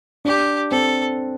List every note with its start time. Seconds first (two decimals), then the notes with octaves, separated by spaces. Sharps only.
0.25 D4 G4
0.71 C4 A4